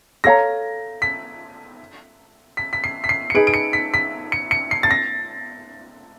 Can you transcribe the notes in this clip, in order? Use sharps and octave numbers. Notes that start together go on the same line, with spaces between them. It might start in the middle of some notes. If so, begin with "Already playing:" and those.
A4 C#5 F5 A#5 A#6
B6
B6
B6
C7
B6
C7
C#7
D#4 G#4 B4 D7
D7
C#7
B6
B6
C#7
C#7
C7
A6
A#6